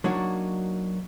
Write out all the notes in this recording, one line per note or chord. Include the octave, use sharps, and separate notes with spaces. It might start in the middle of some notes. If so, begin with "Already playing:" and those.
F#3 A#3 D4 D#4 F#4 C#5